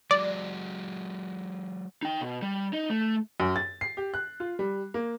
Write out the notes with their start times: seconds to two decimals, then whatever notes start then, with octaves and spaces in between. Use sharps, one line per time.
0.11 F#3 G#3 D5
2.02 D#4 G5
2.21 B2
2.42 G3
2.73 D#4
2.90 A3
3.40 F#2
3.56 A6
3.81 C7
3.97 G4
4.14 F#6
4.40 F4
4.59 G3
4.94 A#3